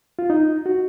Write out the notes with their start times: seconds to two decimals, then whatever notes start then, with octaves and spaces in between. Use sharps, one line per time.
0.19 F4
0.30 D#4
0.66 F#4